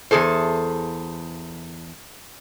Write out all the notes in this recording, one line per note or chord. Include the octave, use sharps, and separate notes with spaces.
E2 E3 G#4 A4 C5